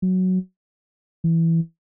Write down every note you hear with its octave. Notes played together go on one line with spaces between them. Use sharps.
F#3
E3